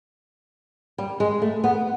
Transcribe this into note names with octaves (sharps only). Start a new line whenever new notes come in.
G3
G#3
A3
B3